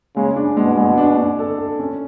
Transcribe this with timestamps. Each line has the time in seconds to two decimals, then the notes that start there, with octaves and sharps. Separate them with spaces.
0.16 C#3 G#3
0.36 D4
0.57 B2 G#3
0.77 G#3
0.98 D4
1.17 D4
1.39 A4
1.58 A4
1.80 C#4